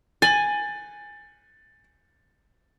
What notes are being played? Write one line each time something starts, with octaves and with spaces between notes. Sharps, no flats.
G#5 A6 F#7